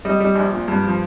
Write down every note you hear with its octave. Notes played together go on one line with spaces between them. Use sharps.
G3 D#5
G3
A#1
A#2
G2
F3